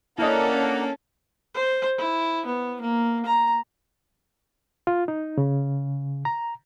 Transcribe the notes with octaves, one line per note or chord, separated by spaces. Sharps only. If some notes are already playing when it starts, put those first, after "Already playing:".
A#3 C#4 D4 E4 A4 A#4 D#5 F#5
C5
E4
B3
A#3
A#5
F4
D#4
C#3
A#5